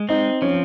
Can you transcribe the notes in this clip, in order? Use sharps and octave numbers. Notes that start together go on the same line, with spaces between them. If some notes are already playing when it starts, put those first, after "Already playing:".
Already playing: G#3
C4 D#4
F3 C#4